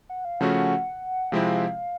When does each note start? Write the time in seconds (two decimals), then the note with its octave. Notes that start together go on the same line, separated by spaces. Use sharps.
0.09 F#5
0.25 F5
0.40 C#3 F3 A3 C#4 F#4 F#5
1.32 C3 F3 G#3 C4 E4 F5